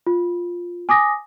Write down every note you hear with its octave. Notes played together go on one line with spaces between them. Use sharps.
F4
G#5 D6 D#6 A#6